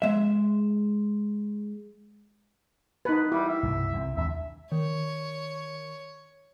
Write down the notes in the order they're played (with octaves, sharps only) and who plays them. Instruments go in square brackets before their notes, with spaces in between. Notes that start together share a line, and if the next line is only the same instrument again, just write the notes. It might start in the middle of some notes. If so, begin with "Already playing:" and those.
[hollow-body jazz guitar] G#3 E5
[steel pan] D#4 B4
[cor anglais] G3 [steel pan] E4
[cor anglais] E5
[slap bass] C2 G2 B2
C2 E3 C4
[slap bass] D#2 G#3 D4 [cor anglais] E5
[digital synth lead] D#3 [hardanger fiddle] C#5